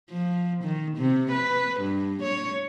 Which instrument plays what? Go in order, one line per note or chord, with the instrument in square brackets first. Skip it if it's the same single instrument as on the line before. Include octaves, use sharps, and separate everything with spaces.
[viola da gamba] F3
D#3
C3
B4
G2
C#5